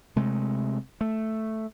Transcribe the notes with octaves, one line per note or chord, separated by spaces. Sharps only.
C3 G#3 A3
A3